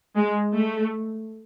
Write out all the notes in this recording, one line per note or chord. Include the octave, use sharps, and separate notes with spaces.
G#3
A3